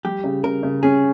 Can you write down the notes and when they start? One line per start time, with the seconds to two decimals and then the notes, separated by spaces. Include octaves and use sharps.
0.05 G3 G4
0.24 C#3
0.43 C#3 A#4
0.63 C#3
0.83 C#4 G#4